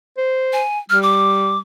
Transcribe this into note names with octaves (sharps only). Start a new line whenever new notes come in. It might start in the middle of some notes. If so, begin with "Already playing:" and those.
C5
G#5
G3 F6
D6